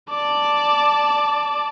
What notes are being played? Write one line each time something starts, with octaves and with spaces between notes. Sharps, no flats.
D5 A5